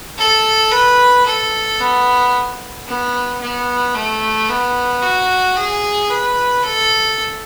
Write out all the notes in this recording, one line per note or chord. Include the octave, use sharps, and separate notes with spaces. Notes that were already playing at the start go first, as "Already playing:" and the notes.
A4
B4
A4
B3
B3
B3
A3
B3
F#4
G#4
B4
A4